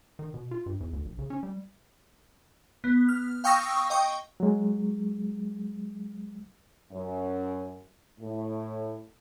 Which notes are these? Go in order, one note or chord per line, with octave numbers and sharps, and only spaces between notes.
D#3
B2
F4
G2
E2
D2
A#1
C#3
C#4
G3
B3
F6
F5 G5 C#6 D#6 E6 A#6
D#5 G5 C#6
F#3 G#3
F#2
A2